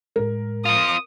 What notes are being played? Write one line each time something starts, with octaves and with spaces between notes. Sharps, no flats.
A2 G#3 A#4
C4 F4 D#6